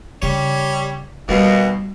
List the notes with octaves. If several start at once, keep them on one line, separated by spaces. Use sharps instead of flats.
C#3 G3 C#5 D5
D#2 B2 G3